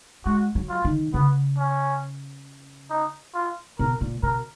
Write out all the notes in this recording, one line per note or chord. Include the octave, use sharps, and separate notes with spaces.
G#3 F#4
F#3
F4
D#3
C#3 B3
C#4
D#4
F4
B2 A#4
A#2
B2 A#4